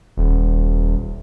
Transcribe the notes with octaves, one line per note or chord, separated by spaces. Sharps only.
D#1